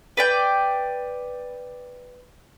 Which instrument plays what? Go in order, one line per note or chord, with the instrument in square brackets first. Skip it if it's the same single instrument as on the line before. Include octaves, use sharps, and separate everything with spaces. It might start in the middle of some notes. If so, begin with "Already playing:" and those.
[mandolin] B4 D5 G5